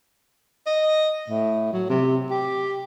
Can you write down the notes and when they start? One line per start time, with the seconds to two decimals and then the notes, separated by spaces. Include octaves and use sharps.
0.66 D#5
1.29 A2
1.73 F#3
1.89 C3
2.31 G4